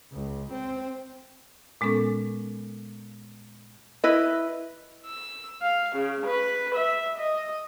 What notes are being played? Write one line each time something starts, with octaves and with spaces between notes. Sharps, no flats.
C#2
C4
A#2 G#3 B3 C#4 A4
E4 B4 D#5
E6
F5
C#3
B4
E5
D#5